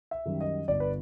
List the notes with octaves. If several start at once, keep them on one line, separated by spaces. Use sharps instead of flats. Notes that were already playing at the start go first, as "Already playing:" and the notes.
E5
F#2 D#3 G3
D#5
G1 D5
B4